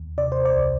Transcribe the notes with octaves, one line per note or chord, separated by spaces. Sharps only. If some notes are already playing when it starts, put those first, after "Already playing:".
Already playing: D#2
C3 D5
C5
D5
C2